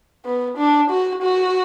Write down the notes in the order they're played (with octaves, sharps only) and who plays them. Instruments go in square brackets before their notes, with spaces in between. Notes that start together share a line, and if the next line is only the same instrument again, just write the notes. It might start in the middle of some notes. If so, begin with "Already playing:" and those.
[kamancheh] B3
D4
F#4
F#4